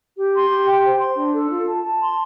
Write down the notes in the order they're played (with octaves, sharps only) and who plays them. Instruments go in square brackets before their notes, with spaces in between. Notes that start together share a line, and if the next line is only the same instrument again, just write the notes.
[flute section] G4
C6
G4
G5
C5
C6
D4
A4
F4
A5
A5
C6